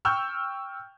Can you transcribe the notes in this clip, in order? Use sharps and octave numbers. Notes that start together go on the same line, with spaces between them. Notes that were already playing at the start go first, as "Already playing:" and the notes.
G5 C#6 E6 F6 G6